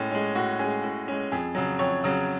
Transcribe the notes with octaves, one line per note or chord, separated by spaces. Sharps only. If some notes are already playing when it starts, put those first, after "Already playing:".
Already playing: A2 G#3 C#4
G#3 C#4
A2 F#4
G#3 C#4 G#4
A2 F#4
G#3 C#4
F2 G#4
C#3 F#3
F2 C#5
C#3 F#3